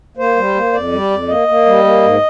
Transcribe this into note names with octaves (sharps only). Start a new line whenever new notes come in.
A#3 C5
G3
A#3
F2 D5
G3
F2
A#3 D#5
A#3
G3
A#3
G#2